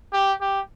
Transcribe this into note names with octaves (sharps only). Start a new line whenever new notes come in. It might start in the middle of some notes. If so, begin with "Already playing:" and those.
G4
G4